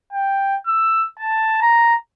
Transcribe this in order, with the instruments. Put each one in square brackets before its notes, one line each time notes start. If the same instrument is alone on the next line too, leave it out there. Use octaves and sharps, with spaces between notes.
[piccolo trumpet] G5
E6
A5
A#5